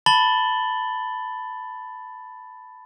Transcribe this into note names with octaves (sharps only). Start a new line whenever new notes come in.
A5 B5 A6 F#7 G7